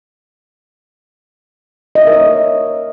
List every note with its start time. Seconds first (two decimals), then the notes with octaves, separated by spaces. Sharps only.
1.95 D#5
2.01 E5
2.07 A#4
2.13 C#5